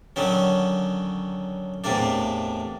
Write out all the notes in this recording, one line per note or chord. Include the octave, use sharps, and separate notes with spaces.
D3 D#3 F#3 C#4
E2 A2 C3 A#3 D4